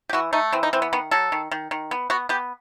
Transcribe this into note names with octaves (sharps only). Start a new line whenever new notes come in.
G4
E3 F#4
A3 D#4
E3 C4
D#4
E3 C4
B3
D#3 B3
F#3 A4
D#3
D#3
D#3
B3
B3 F#4
B3 G4